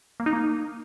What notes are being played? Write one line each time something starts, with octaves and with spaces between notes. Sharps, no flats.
A#3
D#4
A#3